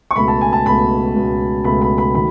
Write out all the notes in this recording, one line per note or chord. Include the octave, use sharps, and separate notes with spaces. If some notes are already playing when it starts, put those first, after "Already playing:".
C#6
C#2 B2 A3 B5
A5
G#5
A5
C#2 B2 A3 B5
C#2 B2 A3
C#2 B2 A3 B5
B5
B5
D#3 F#3 A3 B5